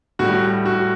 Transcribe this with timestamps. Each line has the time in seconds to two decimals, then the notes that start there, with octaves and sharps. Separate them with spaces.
0.19 A2 G3 F#4
0.65 F#4